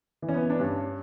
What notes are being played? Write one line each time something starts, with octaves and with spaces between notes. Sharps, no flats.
E3
C#4
B3
D4
G2 C#4